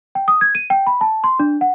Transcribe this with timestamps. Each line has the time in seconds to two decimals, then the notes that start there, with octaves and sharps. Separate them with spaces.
0.15 G5
0.28 D#6
0.41 G#6
0.55 D#7
0.70 G5
0.87 B5
1.01 A5
1.24 C6
1.39 D4
1.61 F#5